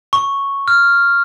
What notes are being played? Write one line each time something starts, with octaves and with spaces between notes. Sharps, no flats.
C#6
F6